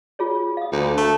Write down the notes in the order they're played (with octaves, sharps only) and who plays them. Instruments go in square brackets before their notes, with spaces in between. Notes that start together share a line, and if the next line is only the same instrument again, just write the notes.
[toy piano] F4 G#4 C#5
F5 D#6
[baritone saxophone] D2
A3